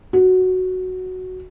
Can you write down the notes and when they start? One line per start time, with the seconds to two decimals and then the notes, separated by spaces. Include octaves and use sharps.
0.13 F#4